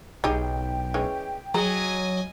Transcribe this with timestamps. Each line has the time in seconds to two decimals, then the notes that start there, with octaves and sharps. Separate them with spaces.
0.24 B1 D#4 G4 G#4 G5
0.94 E3 G#3 C#4
1.54 F#3 G#4 D#5 G#5 A#5